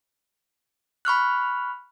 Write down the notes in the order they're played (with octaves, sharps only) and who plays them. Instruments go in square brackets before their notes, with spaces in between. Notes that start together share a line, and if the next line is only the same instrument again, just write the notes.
[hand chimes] B5 C#6 F6 F#6